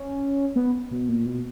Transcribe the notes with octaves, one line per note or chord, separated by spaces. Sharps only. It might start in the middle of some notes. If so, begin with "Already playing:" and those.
Already playing: C#4
B3
B2
A#2
B2